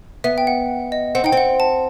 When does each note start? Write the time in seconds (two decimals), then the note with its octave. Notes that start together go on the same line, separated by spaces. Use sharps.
0.24 B3 E5
0.38 G5
0.47 F#5
0.92 D#5
1.15 C4 F#5
1.24 D#4 G5
1.32 C4
1.37 F#5
1.60 A5